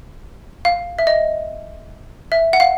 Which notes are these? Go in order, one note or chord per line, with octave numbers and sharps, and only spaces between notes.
F5
E5
D#5
E5
F#5
F5